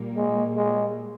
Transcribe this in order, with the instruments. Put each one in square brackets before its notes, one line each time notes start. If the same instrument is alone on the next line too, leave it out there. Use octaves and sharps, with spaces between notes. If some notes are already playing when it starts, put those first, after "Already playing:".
Already playing: [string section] A#2 G3 A#3
[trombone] G#3
G#3